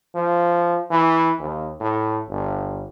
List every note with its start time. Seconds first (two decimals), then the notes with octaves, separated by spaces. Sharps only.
0.15 F3
0.91 E3
1.39 D#2
1.81 A2
2.29 G1